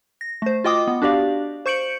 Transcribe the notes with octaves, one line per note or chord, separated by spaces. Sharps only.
A#6
A3 C5
F4 F#4 D#5 G5 D6 D#6
B3
D4 F#4 G4 D5 F5
C5 C#6 G6 C#7 D7 F#7